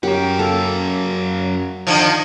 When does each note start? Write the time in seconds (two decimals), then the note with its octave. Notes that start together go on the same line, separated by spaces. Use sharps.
0.03 F#2 G4 A#4 F#5
0.39 F#3 A4 F5
1.87 D3 D#3 F3 G#6